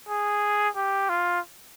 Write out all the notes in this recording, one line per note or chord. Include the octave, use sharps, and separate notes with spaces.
G#4
G4
F4